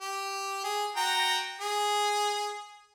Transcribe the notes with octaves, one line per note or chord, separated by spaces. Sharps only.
G4
G#4
F#4 G5 A#5
G#4